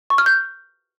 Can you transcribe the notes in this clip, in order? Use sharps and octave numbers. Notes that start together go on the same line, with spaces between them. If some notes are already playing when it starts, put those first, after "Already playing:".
C#6
F6
G6